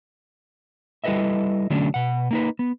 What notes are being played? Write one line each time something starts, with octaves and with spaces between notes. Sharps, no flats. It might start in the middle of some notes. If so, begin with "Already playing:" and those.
G3 E4 A4 B4 D#5 E5
D3 F#3 A3 C#4 D4
B2 F#5
A#3 D#4 B4
B3